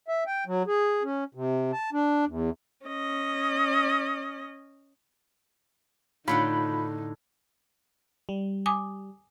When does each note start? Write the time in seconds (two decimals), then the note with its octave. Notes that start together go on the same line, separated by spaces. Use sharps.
0.08 E5
0.27 G5
0.47 F#3
0.67 G#4
1.03 C#4
1.35 C3
1.73 A5
1.93 D4
2.26 E2
2.86 C#4 D#5
6.28 A2 D3 D#4 F4 F#5 B5
8.29 G3
8.66 G#5 D6 D#6